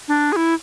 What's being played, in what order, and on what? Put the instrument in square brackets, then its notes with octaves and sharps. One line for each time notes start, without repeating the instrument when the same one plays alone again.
[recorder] D4
G#4
E4